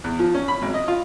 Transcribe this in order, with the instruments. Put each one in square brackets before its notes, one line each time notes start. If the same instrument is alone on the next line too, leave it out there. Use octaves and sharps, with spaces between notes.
[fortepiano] E2
F3
C#4
B5
G#1
D#5
F4